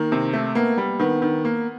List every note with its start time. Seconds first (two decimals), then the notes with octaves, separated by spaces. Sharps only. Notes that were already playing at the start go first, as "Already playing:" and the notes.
Already playing: D#3 A#3
0.12 C3
0.33 A3
0.55 A#3 B3
0.78 G3
0.99 D#3 B3
1.22 D#3
1.45 A#3